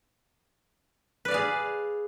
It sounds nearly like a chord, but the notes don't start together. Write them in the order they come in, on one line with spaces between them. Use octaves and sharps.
B4 D5 F5 G#4